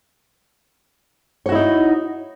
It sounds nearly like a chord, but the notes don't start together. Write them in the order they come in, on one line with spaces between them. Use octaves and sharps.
C#5 F#4 E4 D#4